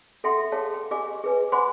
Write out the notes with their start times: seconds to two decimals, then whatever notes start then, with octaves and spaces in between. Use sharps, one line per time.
0.24 A4 E5 F#5 G5 C6
0.52 G#4 C#5 F5 A5
0.74 G5
0.91 G4 D#5 F5 G#5 D6
1.24 G#4 B4 G#5
1.52 C5 F#5 G#5 B5 C6 D6